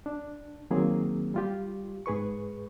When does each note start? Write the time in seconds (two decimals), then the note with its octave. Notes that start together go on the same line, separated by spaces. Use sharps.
0.06 D4
0.71 D#3 F#3 A#3 C4 G#4
1.34 G3 F4 G4
2.06 G#2 G#4 B4 C#6